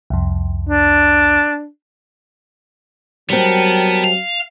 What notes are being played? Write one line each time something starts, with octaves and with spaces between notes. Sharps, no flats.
C2 F2
D4
F#3 G3 B3 C4 A#4 G5 A5
F5